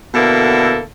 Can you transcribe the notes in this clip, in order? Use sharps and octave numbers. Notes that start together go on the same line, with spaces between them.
B2 D3 A#3 E4 A4